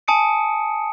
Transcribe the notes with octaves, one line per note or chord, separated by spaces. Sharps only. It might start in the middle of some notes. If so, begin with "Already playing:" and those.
G#5 A5 D#6 C#7 D7